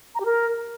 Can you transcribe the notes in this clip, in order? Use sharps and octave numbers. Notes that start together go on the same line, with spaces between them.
A#5
G4
A#4